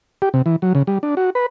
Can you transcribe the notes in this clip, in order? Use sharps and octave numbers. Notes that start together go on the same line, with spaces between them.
G4
C3
E3
F#3
C#3
G3
D4
F#4
B4